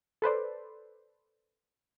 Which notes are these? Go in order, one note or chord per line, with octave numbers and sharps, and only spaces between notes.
A4 B4 C5 D5